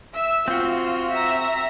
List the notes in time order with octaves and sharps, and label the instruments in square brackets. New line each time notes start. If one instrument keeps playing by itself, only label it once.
[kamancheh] E5 E6
[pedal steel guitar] C4 F#4 [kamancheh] F4
[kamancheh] E5 A#5